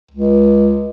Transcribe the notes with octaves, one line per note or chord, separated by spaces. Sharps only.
C#2